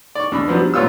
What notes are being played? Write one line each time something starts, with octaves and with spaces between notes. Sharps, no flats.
D5 C#6
D#2 D4 B5
F3 F#3 B3 C4 D4
G3
B1 A#2 B3 F4 C#5 E6